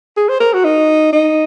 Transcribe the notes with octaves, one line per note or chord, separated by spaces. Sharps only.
G#4
C5
A#4
F#4
D#4
D#4